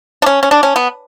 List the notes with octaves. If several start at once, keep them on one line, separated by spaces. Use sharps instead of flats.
D4
C#4
C#4
D4
C#4
B3